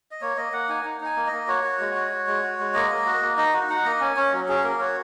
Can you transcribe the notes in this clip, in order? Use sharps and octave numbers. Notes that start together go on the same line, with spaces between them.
D#5
A#3 C#5
A#3 D#5
A#3 F#5
D#4 G#5
D#4
D#4 G#5
A#3
D#5
A#3
F#4 C#5
F#4
G#3
F#4
F#4
G#3
F#4
G#3
A#3 D#5
A#3
F#4
A#3
D#4 D#5
F#4
D#4 F#5
A#3 D#5
C#4 G#5
C#4 C#5
F#3
C#4 G#4
A#3 A#4
F#4 C#5